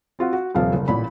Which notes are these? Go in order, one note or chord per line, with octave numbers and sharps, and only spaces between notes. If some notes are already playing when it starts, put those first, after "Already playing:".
C4 F4 F#4
F#4
D#1 C3 F3 F5
F#1
A1 A#2 B5